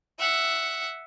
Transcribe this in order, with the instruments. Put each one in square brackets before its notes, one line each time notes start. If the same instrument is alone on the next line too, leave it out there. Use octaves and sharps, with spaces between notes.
[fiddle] E5 F#5